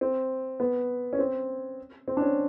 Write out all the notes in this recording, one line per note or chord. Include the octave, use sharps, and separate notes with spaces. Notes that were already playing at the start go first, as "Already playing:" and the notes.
C4
B3
C#4
C4
C4
D4
C#4